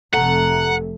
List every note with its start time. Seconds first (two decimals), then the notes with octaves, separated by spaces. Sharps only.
0.13 F1 F2 C3 A3 F#5 A#5